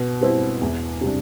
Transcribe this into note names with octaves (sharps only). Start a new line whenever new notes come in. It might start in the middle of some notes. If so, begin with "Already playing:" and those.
Already playing: B2
G3 C4 E4
E2
C3 G3 D4